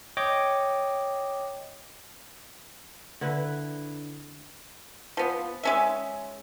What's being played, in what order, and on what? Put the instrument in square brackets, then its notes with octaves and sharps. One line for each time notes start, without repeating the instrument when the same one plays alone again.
[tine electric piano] C#5 D#5 G5 D6
[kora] D3 E4 B4
[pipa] F3 B3
G#3 C#4 E5